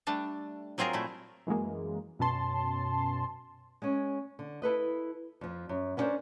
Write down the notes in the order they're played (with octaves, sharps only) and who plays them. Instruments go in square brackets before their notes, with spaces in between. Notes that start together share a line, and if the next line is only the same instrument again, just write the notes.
[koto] G3 A3 D4 A5
F#3 C4 F4 G#4 A#4
A#2 A3 E4
[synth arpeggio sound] F#2 E3 F#3 G#3 A#3
F#2 B2 C#4 A5 C6
[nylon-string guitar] G#3 C#4
D3
E4 A4 B4 D#5
F2 F3
F#2
B3 C#4 D4 F#4 A#4 C5